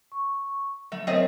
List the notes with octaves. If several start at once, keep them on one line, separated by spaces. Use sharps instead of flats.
C#6
F#3 A3
A3 C4 A#4 C5 C#5 D#5